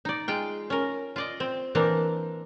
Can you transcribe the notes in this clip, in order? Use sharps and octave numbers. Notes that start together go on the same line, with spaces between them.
D#4 D5
G#3 F4 G5
C#4 A#4
F4 D5 D#5
C4
E3 A#3 C4 D4 A#4